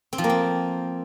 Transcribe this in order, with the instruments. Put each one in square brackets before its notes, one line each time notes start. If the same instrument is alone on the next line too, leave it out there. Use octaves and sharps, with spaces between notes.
[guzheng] C4
F3
A#3
C4